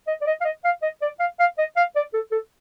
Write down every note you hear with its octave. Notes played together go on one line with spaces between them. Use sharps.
D#5
D5
D#5
F5
D#5
F5
D#5
D5
F5
F5
D#5
F5
D5
A4
A4